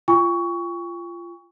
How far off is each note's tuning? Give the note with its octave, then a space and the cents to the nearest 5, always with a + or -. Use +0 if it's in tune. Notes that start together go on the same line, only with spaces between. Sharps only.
F4 -20 G5 +45 C#6 +20